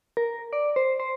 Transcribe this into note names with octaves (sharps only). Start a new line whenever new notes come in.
A#4
D5
C5
C5